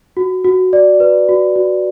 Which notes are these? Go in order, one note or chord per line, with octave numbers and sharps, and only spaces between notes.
F#4
F#4
D5
B4
F#4
F#4